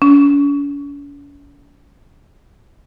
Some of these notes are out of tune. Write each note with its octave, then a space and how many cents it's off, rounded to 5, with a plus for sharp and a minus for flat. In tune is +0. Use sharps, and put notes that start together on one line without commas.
C#4 +45